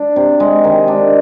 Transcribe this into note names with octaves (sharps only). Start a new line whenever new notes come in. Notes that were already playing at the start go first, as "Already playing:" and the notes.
Already playing: D4
C3
G#3
D#3
D4